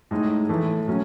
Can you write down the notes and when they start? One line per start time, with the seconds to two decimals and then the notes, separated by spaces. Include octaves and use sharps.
0.11 A2 G#3 D#4
0.49 A2 E3 A3
0.88 A2 F#3 C#4